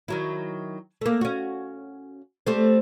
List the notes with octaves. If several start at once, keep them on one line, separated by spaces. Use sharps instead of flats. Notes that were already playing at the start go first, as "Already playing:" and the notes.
D#3 F#3 E4
A3 A#3
C#4 F#4
G3 A3 C4